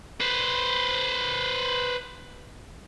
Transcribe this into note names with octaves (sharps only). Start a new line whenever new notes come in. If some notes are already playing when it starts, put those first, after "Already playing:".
B4 C5